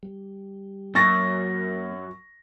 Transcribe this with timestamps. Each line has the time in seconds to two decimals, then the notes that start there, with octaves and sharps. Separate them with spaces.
0.03 G3
0.95 F#2 A#3 C#6 A6 A#6